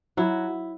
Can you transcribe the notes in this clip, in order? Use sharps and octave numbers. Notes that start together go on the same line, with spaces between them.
F#3 E4